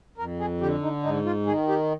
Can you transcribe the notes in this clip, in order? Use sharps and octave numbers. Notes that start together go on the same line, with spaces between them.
F2 A#4
G#4
D3 G4
D#4
G#2 D#4
F4
D#3 G#4
G4